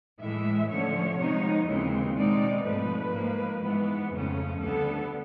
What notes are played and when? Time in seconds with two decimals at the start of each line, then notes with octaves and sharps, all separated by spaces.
0.19 A2 E3 G#3 E5
0.68 D3 F3 A3 C#4 C#5
1.18 C3 F3 G#3 B3 D#4
1.67 D#2 C#3 E3 G#3 C4
2.16 B2 G#3 C4 D#4 D5
2.64 G#2 F3 A3 B4
3.13 G#2 F3 A#3
3.63 G#2 E3 G#3 B3
4.12 F2 C#3 F3 A3 C#4
4.61 D2 D3 G3 B3 A4